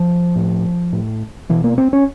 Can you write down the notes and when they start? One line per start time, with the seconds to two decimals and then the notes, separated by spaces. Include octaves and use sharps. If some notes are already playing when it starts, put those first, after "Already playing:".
Already playing: F3
0.36 A2
0.93 A2
1.49 B2 E3
1.64 A#3
1.78 C4
1.93 C#4